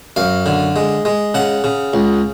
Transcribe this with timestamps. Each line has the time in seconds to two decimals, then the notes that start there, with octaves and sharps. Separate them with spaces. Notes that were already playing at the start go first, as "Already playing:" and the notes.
0.16 F#2 F5
0.46 D3
0.76 G#3
1.05 G#3
1.34 C#3 F#5
1.64 C#3
1.94 C#2